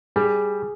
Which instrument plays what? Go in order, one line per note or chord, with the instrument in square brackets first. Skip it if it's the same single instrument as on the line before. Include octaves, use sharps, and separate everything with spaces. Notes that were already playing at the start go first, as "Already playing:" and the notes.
[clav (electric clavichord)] G3 [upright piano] G#4